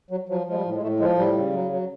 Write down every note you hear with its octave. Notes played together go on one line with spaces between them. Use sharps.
F#3
F3 F#3
F3 G#3
G3
A2
G#3
A2 A3
F3 G#3
A2 G3
C#3
F#3
F#3